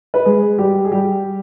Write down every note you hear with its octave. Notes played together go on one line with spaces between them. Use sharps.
B4
G#3 G#4
G3 G4
G#4
G3 G4